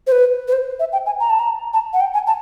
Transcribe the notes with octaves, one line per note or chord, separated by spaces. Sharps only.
C5
B4
B4
C5
E5
G5
G#5
A#5
A5
A#5
A5
F#5
G5
G#5
A5